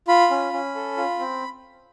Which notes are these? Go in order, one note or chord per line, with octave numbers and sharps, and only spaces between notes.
F4 B5
C#4
C#4
A4
F4
C4